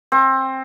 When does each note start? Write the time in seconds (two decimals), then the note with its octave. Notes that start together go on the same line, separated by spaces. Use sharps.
0.12 C4